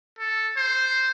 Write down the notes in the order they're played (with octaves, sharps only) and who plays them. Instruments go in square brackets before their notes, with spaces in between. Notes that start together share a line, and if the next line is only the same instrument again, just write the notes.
[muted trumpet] A4
C5